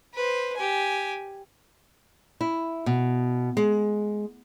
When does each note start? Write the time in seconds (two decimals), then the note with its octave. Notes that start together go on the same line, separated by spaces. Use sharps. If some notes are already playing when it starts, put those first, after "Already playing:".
0.14 B4 C5
0.56 G4 G#5
2.41 E4
2.86 B2
3.57 G#3